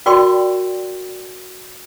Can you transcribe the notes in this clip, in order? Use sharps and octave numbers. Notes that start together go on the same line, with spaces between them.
F#4 A#4 D5 G5 C6 C#6